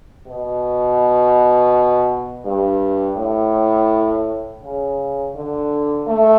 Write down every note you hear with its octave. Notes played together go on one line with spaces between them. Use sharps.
B2
G2
A2
C#3
D3
A3